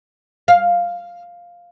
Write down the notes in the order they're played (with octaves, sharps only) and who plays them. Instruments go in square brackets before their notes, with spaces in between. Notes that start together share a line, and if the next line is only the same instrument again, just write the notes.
[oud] F5